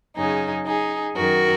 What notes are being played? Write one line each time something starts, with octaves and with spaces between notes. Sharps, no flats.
F#2 C#3 D#4 G#4
D#4 G#4
F#2 D#3 F#4 A#4